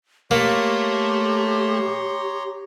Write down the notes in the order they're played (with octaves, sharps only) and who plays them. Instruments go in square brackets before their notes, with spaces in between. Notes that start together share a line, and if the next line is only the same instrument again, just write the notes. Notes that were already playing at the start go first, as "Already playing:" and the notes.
[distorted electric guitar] A3 [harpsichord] A#3 [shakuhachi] G4 [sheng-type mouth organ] C#5 A#5 C6